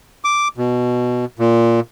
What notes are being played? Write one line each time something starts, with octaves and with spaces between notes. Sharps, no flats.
D6
B2
A#2